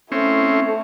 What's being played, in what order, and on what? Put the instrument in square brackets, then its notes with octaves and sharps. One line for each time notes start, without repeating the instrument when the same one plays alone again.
[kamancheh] A3 E4 [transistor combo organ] C4 C#4